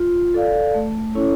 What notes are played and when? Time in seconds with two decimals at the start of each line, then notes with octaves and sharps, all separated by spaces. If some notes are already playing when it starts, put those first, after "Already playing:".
Already playing: F4
0.34 A4 D5 F5
0.74 A3
1.15 C#4 E4 A4 C#5